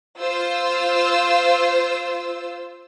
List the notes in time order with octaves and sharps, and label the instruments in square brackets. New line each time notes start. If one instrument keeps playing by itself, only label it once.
[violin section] F4 C5 E6